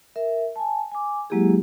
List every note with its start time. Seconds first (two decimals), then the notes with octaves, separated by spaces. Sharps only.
0.16 A#4 E5
0.56 G#5 A5
0.92 G#5 D6
1.30 F#3 G#3 A#3 E4 G4 G#4